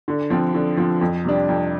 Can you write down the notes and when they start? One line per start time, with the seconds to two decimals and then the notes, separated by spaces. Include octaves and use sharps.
0.08 D3
0.30 F3 C4
0.54 D3
0.77 F3 C4
1.01 F2
1.24 C3 G3 D4
1.49 F2